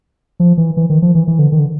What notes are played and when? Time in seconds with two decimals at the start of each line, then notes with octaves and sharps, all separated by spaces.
0.40 F3
0.57 E3
0.77 E3
0.90 D#3
1.02 F3
1.15 E3
1.28 E3
1.39 D3
1.52 D#3
1.59 D3